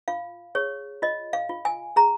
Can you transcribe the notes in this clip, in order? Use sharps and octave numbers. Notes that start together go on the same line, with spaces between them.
F4 F5
G#4 C#5
F4 D#5
F5
F4
G#5
G#4 A#5